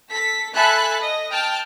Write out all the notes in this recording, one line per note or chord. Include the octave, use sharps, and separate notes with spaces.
A4 B6
A4 E5 G#5 A5 B5 F#6
D#5
G5 A5 F6